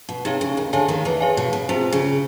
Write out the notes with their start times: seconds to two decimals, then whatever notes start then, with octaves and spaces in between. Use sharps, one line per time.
0.09 B2
0.25 C3 D#4 G#4 C#5 F5
0.41 C#3
0.57 D#2 D#3
0.73 D2 D3 G#4 C#5 F5 G#5
0.88 D#2 D#3
1.05 E2 E3
1.20 G#4 C#5 F5 G#5
1.37 B2
1.53 B2
1.69 C3 F4 G#4 C5
1.92 C#3